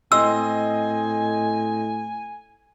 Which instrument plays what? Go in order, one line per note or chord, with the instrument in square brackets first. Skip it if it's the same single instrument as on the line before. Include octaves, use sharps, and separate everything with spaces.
[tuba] A2 [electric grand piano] C4 D#5 C6 [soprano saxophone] G#5 [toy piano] E6